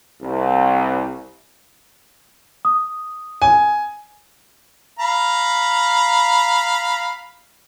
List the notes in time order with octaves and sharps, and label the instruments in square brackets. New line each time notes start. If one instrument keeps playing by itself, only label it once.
[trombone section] C2
[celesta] D#6
[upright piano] G#5
[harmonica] F5 A#5 B5